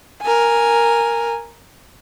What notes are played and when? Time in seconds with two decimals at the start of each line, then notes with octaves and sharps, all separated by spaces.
0.22 A#4 G#5